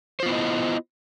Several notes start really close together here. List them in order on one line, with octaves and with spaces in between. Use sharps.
C5 F4 B3 E4 D#5